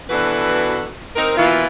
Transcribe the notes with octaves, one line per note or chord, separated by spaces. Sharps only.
B2 E3 D4 F#4 A4 B4
C4 D#4 A#4
B2 E3 A#3 E4 F4